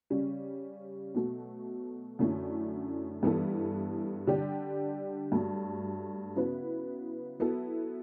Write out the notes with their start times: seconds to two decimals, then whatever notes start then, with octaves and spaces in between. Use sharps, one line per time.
0.10 C#3 G3 C#4
1.15 B2 F#3 A3
2.19 F#2 D3 A3 C#4 E4
3.23 G2 E3 B3 E4 A4
4.27 D3 G3 D4 G4 D5
5.32 G2 F#3 A3
6.36 C#3 F#3 B3 E4 B4
7.40 F#3 B3 E4 A4